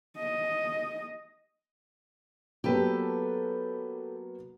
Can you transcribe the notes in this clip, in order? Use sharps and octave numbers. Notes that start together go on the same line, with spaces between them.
D#5
F#3 A#3 B3 G4 A4 B4